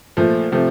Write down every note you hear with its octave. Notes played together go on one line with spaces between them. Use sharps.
A#2 F3 A3
C3 F3 A3